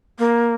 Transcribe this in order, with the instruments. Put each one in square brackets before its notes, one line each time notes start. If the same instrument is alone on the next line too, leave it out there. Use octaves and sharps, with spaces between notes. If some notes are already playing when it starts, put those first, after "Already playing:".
[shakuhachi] A#3